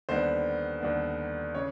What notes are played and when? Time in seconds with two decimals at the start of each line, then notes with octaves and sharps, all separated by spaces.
0.09 D#2 D3 G3 B3 C5
0.81 D#2 D3 G3 B3
1.55 C#3 E3 C#5